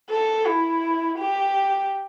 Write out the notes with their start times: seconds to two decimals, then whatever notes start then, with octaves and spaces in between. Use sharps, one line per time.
0.10 A4
0.46 E4
1.19 G4